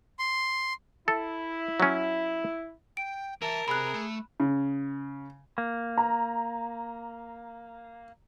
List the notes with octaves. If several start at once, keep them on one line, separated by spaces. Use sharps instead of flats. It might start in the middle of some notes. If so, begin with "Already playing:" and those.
C6
E4 A4
F#3 C#4
G5 D7
E3 A#4 E5 A5
C3 G#4 B5 F#6
A3
C#3
A#3
A#5